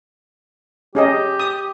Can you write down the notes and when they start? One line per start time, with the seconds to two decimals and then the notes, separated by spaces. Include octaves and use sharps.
0.95 C#4 G4 G#4 D#5
1.40 D#6